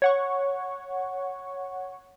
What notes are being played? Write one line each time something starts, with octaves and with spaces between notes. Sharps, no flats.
C#5 F#5 C#6